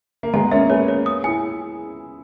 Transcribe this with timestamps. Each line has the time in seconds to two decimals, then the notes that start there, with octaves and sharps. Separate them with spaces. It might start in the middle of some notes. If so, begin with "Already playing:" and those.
0.23 A#3
0.33 G#3 B3 A#5
0.52 A#3 C#4 E5
0.70 G#4 B4 C#5
0.88 C#5
1.06 D#6
1.24 E4 G#4 G#5